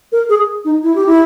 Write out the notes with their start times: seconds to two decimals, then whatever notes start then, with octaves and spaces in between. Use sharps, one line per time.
0.12 A#4
0.29 G#4
0.65 D#4
0.83 E4
0.95 G4
1.06 E4